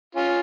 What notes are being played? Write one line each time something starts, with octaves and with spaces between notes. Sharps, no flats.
C#4 F4